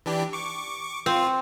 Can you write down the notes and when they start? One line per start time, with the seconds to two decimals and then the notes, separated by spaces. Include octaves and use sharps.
0.06 E3 D4 G4
0.33 C#6 D6
1.06 C4 F4